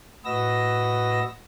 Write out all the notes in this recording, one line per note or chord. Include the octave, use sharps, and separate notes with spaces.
A2 F#4 B4 D#5 E6 A#6